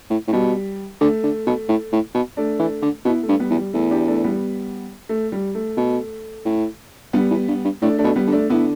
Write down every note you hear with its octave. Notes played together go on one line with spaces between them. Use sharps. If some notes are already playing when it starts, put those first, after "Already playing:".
A2
A2
B2 G3
D3 A3
D3
B2
A2
A2
B2
A3 D4
E3
D3
B2 B3 E4
A3
G2
G3 B3
E2
G3
E2 A3
D4 G4
A3 D4
G3 B3
A3
G3
A3
B2
A2
G2 G3 B3
E2
G2
G2
A2 A3 D4
A3 D4
B2
G3 B3
D3
A3 D4
D3 B3 E4